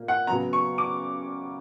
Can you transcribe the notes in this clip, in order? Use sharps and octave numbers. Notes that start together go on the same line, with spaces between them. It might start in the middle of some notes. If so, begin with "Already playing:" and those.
Already playing: A#2 A#3
F#5
C#3 F#3 B3 A#5
C#6
D6